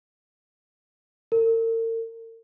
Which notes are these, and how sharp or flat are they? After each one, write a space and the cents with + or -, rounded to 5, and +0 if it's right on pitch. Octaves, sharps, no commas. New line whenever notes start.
A#4 -45